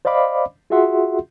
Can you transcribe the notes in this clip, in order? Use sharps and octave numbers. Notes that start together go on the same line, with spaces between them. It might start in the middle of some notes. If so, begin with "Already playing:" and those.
C5 D5 D#5 F5 B5 D6
F4 F#4 G#4 E5 F#5 C6